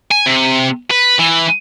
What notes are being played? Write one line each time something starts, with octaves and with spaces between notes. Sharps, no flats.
G#5
C3
B4
E3